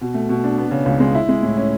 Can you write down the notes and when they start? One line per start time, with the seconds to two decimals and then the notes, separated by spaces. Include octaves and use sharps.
0.01 B2
0.14 A3
0.29 B2
0.44 D4
0.58 B3
0.71 C#3
0.86 C#2
1.00 G#3
1.15 E4
1.29 G#3
1.43 A2
1.57 C#4